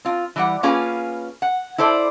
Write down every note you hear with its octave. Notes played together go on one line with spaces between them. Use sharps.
C4 F4
E3 G3 F#5
A#3 C#4 F4 G#4 B4 G#5
F#5
E4 A4 C5 D5